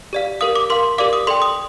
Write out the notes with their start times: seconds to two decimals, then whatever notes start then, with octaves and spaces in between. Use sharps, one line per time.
0.13 G4 D5 F5
0.41 G4 A#4 F5 D#6
0.56 D6
0.70 A#4 F5 C6
0.98 G4 A#4 D5 F5 D6
1.13 D#6
1.27 A4 D5 G5 C6
1.42 D#6